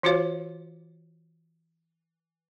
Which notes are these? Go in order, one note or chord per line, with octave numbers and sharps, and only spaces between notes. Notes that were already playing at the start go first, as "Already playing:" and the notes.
E3 F4 F#4 C5 C#5 F5